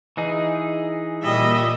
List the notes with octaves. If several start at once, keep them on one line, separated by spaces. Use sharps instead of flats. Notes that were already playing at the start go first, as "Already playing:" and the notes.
E3 D#4 G#4
A#2 G3 D#5 E5